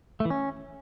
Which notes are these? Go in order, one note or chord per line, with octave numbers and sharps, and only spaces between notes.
A3
E3
C#4